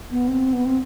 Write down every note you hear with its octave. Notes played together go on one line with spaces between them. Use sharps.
B3
C4
B3
C4